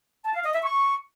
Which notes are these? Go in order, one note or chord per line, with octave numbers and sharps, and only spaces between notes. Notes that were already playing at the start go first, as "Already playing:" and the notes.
A5
F5
D#5
E5
C#6